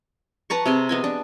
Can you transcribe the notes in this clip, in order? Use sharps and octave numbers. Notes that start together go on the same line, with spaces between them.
B4 A5 A#5 C#6
C3 G#4 C6
B3 D#5 G#5
D4